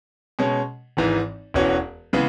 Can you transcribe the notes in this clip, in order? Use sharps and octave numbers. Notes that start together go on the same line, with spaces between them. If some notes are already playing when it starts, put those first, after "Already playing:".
B2 G#3 C#4
G#1 G#2 E3
E1 E2 E3 C#4 F#4
C#3 E3 G#3 B3